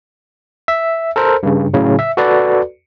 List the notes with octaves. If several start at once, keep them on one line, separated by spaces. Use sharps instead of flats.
E5
A4 A#4 C5
G2 C#3
A2 C#3 F#3
E5
F#4 A4 B4 D5